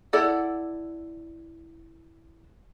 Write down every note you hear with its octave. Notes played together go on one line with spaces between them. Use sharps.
E4 A4 D5 F#5